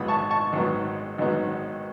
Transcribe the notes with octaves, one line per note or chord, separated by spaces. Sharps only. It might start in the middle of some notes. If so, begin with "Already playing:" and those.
Already playing: G#1 G#2 D#3 F#3 B3 B5 D#6
A5 C#6
A5 C#6
G#1 G#2 D#3 F#3 B3
G#1 G#2 D#3 F#3 B3